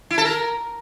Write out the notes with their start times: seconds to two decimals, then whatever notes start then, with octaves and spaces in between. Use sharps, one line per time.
0.10 E4
0.18 A4
0.25 A#4